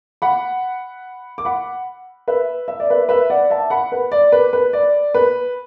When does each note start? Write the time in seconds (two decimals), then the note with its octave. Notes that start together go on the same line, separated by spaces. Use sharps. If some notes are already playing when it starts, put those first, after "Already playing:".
0.22 F#5 B5
1.38 D6
1.45 F#5 B5
2.28 B4 E5
2.68 E5
2.80 D5
2.90 B4 E5
3.09 B4 E5
3.30 D5 F#5
3.50 E5 A5
3.70 F#5 B5
3.92 B4
4.12 D5
4.32 B4
4.53 B4
4.73 D5
5.14 B4